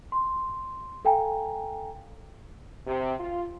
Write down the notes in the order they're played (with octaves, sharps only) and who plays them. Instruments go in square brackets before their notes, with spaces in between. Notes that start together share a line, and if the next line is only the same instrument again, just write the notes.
[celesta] C6
A4 F5 G5 G#5 A#5
[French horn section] C3
F4